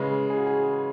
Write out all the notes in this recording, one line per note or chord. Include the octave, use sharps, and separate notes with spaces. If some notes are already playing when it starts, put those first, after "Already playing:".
Already playing: C#3 G#3 B4
G#4
F#4
G#4